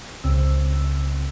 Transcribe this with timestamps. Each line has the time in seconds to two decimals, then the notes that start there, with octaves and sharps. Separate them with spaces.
0.24 C#2 C#3 C4 E6